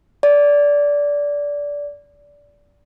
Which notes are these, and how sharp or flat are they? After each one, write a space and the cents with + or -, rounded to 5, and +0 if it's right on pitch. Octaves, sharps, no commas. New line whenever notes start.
D5 -15